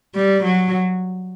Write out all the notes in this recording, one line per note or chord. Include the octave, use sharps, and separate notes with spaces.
G3
F#3